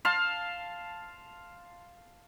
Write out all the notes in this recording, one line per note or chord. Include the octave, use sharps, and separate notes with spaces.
F5 A5 C6